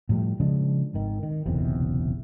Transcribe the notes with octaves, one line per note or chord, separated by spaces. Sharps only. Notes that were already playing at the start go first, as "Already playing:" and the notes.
A2 F3 G3
C#3 F3 G#3 D4
G#1 D#3
D#3
F#1 B1 E2 C3